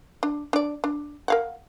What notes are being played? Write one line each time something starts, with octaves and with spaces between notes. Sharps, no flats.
D4
D4 D5
D4
A#4 F5 F#5